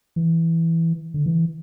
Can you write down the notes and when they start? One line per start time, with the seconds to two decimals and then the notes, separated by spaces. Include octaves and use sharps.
0.16 E3
1.14 D3
1.26 E3